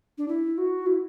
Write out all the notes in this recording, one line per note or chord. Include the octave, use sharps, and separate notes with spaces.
D4
E4
F#4
E4